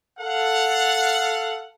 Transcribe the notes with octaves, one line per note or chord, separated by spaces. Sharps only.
A4 F5 F#5